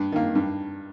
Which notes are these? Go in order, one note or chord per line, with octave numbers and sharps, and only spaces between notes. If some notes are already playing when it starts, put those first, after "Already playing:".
Already playing: G2
D#3 A#3
G2